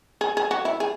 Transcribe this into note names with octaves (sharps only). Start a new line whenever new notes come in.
G#4
G#4
F#4
E4
G#4